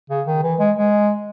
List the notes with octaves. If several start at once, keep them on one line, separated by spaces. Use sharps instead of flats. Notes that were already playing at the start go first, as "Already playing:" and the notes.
C#3
D#3
E3
G#3
G#3